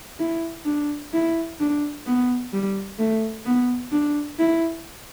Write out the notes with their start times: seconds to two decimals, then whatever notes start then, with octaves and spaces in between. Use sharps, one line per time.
0.20 E4
0.66 D4
1.13 E4
1.60 D4
2.06 B3
2.53 G3
2.99 A3
3.46 B3
3.92 D4
4.39 E4